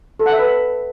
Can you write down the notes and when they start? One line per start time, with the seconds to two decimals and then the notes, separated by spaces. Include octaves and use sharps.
0.20 A4
0.26 F#5
0.32 E5
0.39 B4